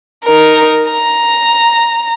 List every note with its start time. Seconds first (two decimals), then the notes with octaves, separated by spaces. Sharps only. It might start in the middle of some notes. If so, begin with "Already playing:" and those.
0.24 D#4 A#4
0.90 A#5